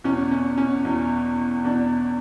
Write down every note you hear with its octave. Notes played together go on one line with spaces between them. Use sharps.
E2 B2 C#4
C#4
C#4
E2 B2
E2 B2 D4